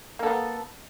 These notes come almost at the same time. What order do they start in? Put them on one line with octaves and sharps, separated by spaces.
A#3 A4 B3